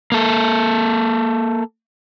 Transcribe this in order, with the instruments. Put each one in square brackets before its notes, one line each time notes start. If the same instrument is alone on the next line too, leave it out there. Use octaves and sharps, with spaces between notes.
[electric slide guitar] A#3 A4